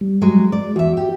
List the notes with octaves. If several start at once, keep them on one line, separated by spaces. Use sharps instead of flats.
G3
F#3 G#3 G#4
G#3 D5
E2 F#4 E5
G4